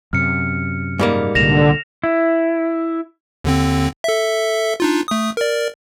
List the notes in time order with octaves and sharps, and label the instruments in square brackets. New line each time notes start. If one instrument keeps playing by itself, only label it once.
[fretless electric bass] F#2 C3 [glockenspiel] F6 C#7
[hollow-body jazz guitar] G#2 G3 A#3
[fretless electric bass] C2 A#2 [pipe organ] D3 [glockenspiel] A#6 E7 F7
[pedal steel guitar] E4
[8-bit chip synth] D#2 D3 C4
A4 E5
D4 D#4 F4
A3 D#6
A#4 D5